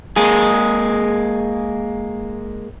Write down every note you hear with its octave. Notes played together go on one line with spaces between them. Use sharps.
G#3 A#3 G#4